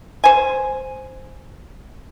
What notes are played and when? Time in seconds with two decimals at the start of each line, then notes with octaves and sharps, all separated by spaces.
0.24 C5 G#5